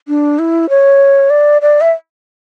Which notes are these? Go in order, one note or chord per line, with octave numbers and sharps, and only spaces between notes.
D4
E4
C#5
D5
D5
E5